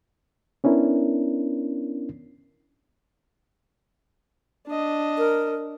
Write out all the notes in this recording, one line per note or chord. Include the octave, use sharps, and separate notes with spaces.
B3 C#4 D4 E4 A#4
D4 D#5
A#4